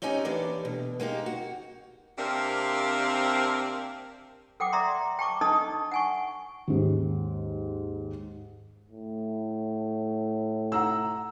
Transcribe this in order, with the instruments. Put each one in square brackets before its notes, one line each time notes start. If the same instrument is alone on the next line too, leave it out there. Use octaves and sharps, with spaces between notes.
[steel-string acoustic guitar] C4 C#4 D#4 G4 G#5
E3 A#3 D4 G4 A4 D5
B2
G#3 A#3 D#4 G4
F#4
[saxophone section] C3 A#3 C4 D4 A#4
[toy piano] A4 F#5 G5 D6
D5 E5 A#5 C6
G5 A5 C#6 D6
D4 D#4 A4 D#5 A5 D#6
F#5 G#5 C#6
[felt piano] D#2 G#2
[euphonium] A2
[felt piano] F#5 A#5 E6